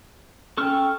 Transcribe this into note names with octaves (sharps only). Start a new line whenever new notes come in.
C#4 A4 G5 C#6 F6